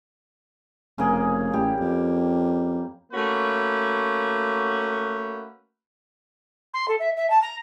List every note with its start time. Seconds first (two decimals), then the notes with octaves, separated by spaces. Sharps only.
0.98 F1 C#3 A#3 G#4
1.53 A1 G3 G4
1.80 F2
3.12 A3 A#3 C#4 F#4 B4
6.73 C6
6.88 A4
7.00 E5
7.17 E5
7.30 A5
7.42 A#5